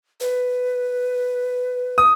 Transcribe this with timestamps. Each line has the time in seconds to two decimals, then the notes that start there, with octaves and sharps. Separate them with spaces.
0.21 B4
1.98 D#6